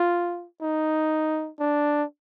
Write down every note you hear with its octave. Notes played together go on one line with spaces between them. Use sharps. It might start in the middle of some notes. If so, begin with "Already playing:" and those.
Already playing: F4
D#4
D4